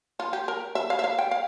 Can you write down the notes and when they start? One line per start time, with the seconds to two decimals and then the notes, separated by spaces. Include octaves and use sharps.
0.20 F4
0.33 G4
0.48 A#4
0.75 E5
0.90 F5
0.99 E5
1.04 F5
1.19 G5
1.31 F5